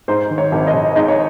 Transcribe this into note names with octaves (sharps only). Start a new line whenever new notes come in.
G#2 C5
D#3
C#5
G#1
D#5
G#1
G#2 D#5
C#5